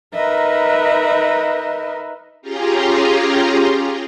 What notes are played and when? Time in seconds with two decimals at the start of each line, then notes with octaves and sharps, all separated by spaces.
0.14 D#4 A#4 B4 D#5 E5
2.42 C#4 F4 G4 G#4 A#5 C6